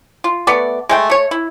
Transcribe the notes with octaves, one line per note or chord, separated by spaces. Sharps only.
F4
A3 B3 D5
G#3 A3 G5
A3 C#5
E4